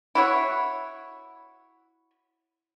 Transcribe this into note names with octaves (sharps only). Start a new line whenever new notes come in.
E4 F#4 C#5